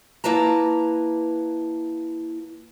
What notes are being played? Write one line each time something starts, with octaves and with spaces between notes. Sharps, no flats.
A#3 E4 B4 A5 A#5